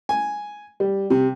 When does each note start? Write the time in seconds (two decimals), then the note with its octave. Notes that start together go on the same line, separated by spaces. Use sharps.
0.09 G#5
0.80 G3
1.10 C3